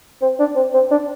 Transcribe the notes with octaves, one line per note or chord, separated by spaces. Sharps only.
C4
D4
C4
C4
D4